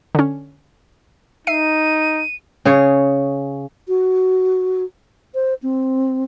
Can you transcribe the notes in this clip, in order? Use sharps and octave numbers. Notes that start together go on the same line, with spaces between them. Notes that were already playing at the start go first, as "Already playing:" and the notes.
D3 C#4
D#4 E5 C7 D#7
C#3 G#4 C#5
F#4
C5
C4